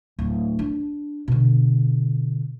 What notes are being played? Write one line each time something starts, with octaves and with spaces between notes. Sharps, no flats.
D1
D4
B2 D3